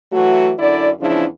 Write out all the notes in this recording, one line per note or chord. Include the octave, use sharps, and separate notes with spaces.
E3 F#3 A3 F#4
F#2 D3 E4 D5
E2 C#3 F3 D4 E4